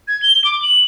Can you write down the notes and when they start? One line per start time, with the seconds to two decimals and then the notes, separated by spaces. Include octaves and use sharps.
0.08 G#6
0.23 G7
0.45 D6
0.62 F#7